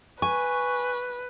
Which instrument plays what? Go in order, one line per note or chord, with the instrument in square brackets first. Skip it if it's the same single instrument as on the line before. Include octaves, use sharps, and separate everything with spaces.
[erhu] B4 [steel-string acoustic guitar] G#5 [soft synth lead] C#6